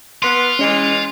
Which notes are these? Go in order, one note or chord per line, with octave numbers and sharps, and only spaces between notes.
B3 F4 C6
E3 G#3 C#4